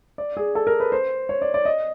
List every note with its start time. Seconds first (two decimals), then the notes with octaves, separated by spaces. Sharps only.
0.18 D5
0.37 G#4
0.55 A4
0.67 A#4
0.80 B4
0.92 C5
1.29 C#5
1.42 D5
1.54 D5
1.65 D#5